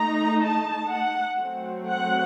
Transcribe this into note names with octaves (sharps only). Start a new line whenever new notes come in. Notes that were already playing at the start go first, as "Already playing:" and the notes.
Already playing: A3 D#4 A#5
A5
F#5
F#3 A3 C4
F#5